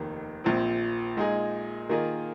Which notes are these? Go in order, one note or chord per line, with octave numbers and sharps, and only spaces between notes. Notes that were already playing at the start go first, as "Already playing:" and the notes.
Already playing: F1 D#2 D#3
A#1 A#2 F3 C4
A#2 G#3 D#4 G#4
D#3 A#3 F4 G#4 D#5